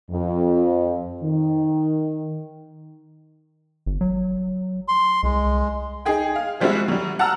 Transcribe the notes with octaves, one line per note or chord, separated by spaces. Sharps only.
F2
D#3
G1
F#3
C6
C2 G#3
D#4 G#4 G5
F5
F3 G3 G#3 C4 F#4 E5
F#3 G3
F#5 A5 A#5 E6 F6